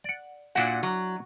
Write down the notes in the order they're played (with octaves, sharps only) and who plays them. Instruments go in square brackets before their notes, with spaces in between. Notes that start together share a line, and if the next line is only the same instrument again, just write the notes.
[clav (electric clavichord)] D5 F#5
[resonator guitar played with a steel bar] A#2 F#5 [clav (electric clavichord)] D4 E4 F#4
[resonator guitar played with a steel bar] F#3